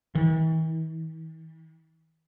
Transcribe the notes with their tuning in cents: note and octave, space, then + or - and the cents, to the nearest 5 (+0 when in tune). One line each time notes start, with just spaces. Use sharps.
E3 -45